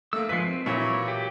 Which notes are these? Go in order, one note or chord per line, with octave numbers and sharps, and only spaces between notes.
A3 A#3 E6
F3 G#3 B4 B6 C7
C4
A#2 E3 F#3 E4 C#5 E5
G4